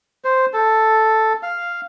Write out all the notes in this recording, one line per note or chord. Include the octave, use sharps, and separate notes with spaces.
C5
A4
F5